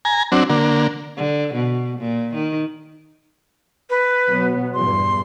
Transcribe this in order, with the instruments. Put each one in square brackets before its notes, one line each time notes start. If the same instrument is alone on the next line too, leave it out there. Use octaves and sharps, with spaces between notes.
[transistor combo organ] G#5 A#5
F#3 C4 D4
D3 A#3
[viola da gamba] D3
B2
A#2
D#3
[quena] B4
[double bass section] B2 F#3 B3
[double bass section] A#1 E2 G2 [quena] C6